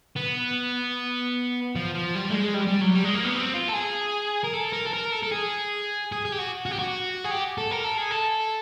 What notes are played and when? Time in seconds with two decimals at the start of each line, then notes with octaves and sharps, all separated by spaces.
0.16 B3
1.76 F3
1.95 F3
2.15 G3
2.30 A3
2.34 G#3
2.54 G3
2.67 G3
2.81 F#3
2.94 G3
3.04 G#3
3.14 A#3
3.25 B3
3.35 C4
3.54 F4
3.68 A4
3.73 G#4
4.43 A#4
4.53 A4
4.73 A#4
4.86 A4
4.93 A#4
5.12 A4
5.23 A4
5.32 G#4
6.12 G#4
6.25 G#4
6.32 G4
6.39 F#4
6.66 F#4
6.71 G4
6.79 F#4
7.24 G#4
7.31 G4
7.58 A4
7.71 A#4
7.84 A4
7.98 G#4
8.11 A4